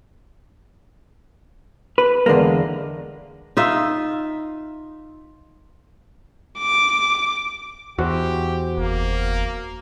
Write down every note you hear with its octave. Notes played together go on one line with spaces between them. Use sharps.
B4
E2 D3 G#3 A#3
D#4 F4 E5
D6
E2 F#4 G4 C5
F#1 A#3